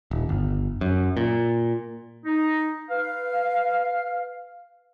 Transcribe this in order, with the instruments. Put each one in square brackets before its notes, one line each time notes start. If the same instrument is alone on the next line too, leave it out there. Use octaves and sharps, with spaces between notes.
[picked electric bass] D#1
G1
F#2
A#2
[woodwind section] D#4
B4 F5